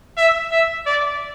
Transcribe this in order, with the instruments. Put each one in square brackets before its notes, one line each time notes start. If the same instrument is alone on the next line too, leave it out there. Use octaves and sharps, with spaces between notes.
[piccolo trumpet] E5
E5
D5